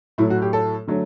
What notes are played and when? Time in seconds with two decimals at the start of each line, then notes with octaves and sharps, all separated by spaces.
0.18 A2 F#3 A3 E4
0.30 F#4
0.42 G4
0.53 A4
0.87 D3 F#3 A3